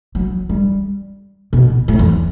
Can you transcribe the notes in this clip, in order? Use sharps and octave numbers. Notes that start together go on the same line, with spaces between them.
F#3
G3
B2
A2
E2